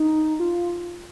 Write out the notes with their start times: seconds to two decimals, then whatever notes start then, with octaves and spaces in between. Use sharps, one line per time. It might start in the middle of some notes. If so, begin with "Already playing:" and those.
Already playing: D#4
0.40 F4